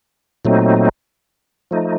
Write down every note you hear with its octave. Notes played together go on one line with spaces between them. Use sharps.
A#2 F#3 A3 C4 D#4
F3 A3 D#4